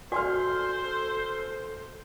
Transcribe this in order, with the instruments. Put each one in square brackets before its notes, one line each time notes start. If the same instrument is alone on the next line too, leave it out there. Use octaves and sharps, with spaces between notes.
[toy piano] F#4 D5 [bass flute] A4 [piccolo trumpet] C5 [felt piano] G#5 C6 F6